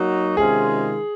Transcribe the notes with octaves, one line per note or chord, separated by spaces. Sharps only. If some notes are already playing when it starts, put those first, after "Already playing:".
Already playing: F#3 A#3 D#4 F#4
C3 D#3 G#3 C#4 F4 G#4